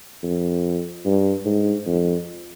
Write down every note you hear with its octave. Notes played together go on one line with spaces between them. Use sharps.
F2
G2
G#2
F2